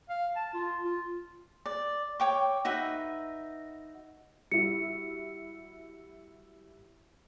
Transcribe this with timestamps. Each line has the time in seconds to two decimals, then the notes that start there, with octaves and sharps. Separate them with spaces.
0.09 F5
0.36 A5
0.54 F4
0.84 F4
1.66 D5
2.20 C#5 G5 D6
2.65 D#4 F#4 B4 E5
4.51 G3 E4 F#4 C#7